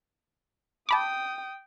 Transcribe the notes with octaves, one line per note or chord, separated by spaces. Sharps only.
G5 A5 B5 D6 D#6